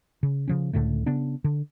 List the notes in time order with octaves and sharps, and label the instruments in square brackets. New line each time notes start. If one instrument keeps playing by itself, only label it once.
[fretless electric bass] C#3
C#3 F3 C#4
C#2 A2 D3 A3
C#3 B3 D4
D3